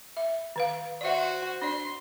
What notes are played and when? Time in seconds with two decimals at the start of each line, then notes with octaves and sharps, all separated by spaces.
0.17 E5
0.56 D#3 B4 F5
1.01 F#4 C5 D5 E5
1.62 D4 D5 C6